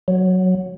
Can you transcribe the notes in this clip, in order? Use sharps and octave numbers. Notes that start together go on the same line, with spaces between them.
F#3